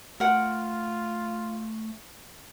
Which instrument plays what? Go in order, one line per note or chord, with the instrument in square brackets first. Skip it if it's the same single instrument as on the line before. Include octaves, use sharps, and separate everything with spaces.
[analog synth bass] A3 [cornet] F4 [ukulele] A#4 F#5